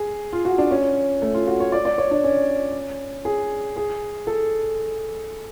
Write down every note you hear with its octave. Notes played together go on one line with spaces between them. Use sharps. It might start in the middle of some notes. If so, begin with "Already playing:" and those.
Already playing: G#4
F4
F#4
D4
C#4
A3
F4
F#4
C#5
D5
D5
C#5
D4
C#4
G#4
G#4
A4